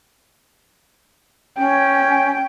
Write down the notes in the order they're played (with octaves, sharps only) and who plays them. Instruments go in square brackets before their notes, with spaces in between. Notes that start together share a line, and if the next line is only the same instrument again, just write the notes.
[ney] C#4 [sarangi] G5